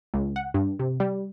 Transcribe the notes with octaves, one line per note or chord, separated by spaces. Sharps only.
C#2
F#5
G2
C3
G3